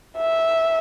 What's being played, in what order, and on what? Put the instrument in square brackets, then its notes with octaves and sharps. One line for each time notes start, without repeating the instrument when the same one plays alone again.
[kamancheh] E5